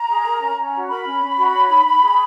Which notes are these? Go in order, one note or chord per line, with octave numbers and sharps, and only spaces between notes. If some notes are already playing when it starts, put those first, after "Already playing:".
Already playing: A#5
G#4
A#4
C#4
C#4
F#4
A#4 B5
C#4
C#4
F#4
C#5
D#4
D#4
G#4